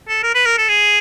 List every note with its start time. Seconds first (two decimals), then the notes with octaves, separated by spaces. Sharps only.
0.08 A4
0.23 A#4
0.35 B4
0.46 A#4
0.58 A4
0.69 G#4